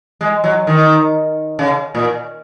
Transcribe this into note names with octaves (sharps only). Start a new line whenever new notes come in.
G#3
F#3
D#3
C#3
A#2